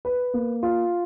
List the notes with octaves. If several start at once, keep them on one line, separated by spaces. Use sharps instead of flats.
B4
A#3
F4